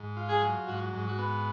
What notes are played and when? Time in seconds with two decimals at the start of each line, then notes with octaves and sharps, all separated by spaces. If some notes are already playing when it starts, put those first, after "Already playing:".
Already playing: G#2
0.17 F4
0.29 G#4
0.42 F#3
0.67 G#2 F#4
0.93 G#2
1.06 F#4
1.19 B3